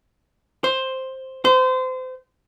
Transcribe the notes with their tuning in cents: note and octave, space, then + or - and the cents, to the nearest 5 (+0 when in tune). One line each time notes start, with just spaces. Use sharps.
C5 +5
C5 -30